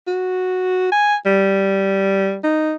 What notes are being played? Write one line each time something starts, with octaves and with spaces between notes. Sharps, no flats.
F#4
G#5
G3
D#4